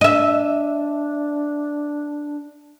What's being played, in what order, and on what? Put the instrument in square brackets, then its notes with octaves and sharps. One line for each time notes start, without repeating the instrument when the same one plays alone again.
[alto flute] D4 [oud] D#5 E5